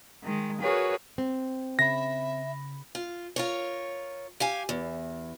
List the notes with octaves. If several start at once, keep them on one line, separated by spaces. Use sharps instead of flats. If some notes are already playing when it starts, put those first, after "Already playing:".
D#3 G#3
F#4 G#4 A#4 B4 C#5
C4
C#3 E5 B5 A#6
F4
F4 A#4 C#5
G4 F5 G#5
E2